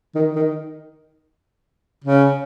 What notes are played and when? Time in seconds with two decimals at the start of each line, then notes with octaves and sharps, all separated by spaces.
0.15 D#3
0.35 D#3
2.04 C#3